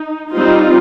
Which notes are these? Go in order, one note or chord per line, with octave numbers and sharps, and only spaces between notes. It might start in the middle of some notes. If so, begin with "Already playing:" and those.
Already playing: D#4
G3 C4 D#4 F4